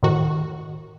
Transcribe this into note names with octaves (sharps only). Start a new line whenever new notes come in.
A2 D#3 F#4